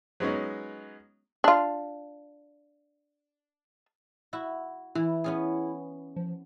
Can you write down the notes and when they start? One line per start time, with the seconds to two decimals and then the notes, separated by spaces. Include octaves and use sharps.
0.20 F#3 G#3 B3 C#4 D#4
1.44 D4 F4
4.33 E4 F#4
4.95 E3 E4
5.24 B3 C#4 G#4
6.16 F3